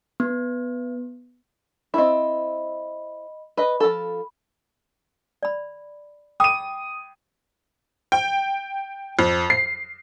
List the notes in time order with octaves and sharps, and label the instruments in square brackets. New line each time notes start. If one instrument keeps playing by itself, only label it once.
[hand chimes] B3
[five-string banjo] C4 E4 [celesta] D#5 B5
[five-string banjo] B4 D#5 [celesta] B5
[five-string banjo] F3 A4
[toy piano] D5 B5
[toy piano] G5 B5 D6 [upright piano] D#6 D#7
[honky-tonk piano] G5
F2
C7